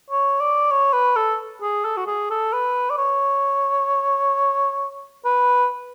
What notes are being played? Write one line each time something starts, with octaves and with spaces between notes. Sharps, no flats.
C#5
D5
C#5
B4
A4
G#4
A4
F#4
G#4
A4
B4
D5
C#5
B4